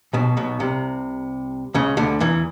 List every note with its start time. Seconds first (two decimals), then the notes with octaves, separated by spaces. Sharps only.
0.13 B1 B2
0.37 B1 B2
0.60 C2 C3
1.74 C#2 C#3
1.97 D2 D3
2.20 E2 E3